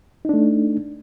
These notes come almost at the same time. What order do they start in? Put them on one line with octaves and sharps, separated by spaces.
D#4 D4 A3